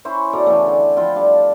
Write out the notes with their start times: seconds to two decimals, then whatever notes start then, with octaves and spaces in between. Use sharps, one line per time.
0.05 C#4 E4 C5 C#5
0.33 B2 A4 D5 A#5
0.46 C#3 E3 A3
0.67 D3
0.96 F3 E4 F4 G5
1.15 G3 D4 F5 A5